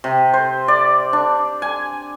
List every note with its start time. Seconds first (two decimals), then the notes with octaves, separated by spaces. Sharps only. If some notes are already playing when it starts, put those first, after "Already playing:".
0.04 C3
0.34 C5
0.68 D5
1.13 D4
1.62 G#5